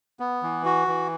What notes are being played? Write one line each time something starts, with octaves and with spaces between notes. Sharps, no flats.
B3
E3
F#4
E3